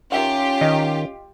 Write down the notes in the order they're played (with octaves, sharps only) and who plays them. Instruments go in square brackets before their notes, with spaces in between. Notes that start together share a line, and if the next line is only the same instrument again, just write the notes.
[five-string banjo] D#3 E5 F#5 [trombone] C#4 [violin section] F4 G4
[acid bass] D#3 [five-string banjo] D#5